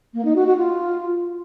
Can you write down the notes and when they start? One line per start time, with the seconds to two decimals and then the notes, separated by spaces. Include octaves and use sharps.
0.14 A#3
0.25 D#4
0.36 F#4
0.47 F#4
0.57 F4